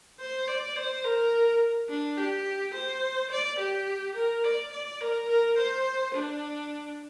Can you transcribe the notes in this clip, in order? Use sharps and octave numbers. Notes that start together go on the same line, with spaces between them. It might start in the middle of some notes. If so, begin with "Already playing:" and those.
C5
D5
C5
A#4
D4
G4
C5
D5
G4
A#4
D5
D5
A#4
A#4
C5
D4